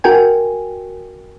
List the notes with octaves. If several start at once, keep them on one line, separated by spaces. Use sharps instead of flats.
F#4 A#4 G5 G#5